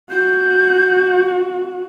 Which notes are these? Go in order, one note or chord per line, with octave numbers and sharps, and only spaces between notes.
F#4 G6